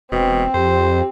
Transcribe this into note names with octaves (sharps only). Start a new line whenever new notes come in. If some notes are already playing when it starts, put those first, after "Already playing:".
E1 B2 C4
F2 G4 C5